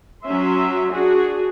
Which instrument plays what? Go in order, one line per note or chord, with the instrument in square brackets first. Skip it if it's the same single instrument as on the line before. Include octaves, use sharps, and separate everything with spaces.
[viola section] F#3 C#4 E5 C6
D4 F#4 G#4